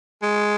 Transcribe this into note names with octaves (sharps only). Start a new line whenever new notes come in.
G#3